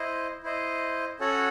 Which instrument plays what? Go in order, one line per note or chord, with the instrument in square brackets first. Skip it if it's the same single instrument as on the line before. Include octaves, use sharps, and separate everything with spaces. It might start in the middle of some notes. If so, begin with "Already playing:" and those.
Already playing: [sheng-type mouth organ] E4 C5 D#5
E4 C5 D#5
C#4 F#4 A4 C#5 F#5